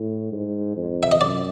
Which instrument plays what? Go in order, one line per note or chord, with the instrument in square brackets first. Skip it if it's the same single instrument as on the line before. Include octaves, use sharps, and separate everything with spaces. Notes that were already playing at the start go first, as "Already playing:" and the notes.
Already playing: [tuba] A2
G#2
F2
[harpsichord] E5
D#5
[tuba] F#2 [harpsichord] D5